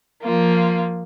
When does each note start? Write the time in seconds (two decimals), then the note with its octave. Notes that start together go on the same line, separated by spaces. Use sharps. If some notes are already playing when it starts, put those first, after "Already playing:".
0.22 F3 A#3 F4